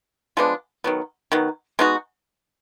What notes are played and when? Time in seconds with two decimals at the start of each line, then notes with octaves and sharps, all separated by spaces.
0.37 F3 G#3 B3 D4
0.84 D#3 F#3 B3
1.32 D#3 F#3 B3
1.79 G#3 B3 D#4 F#4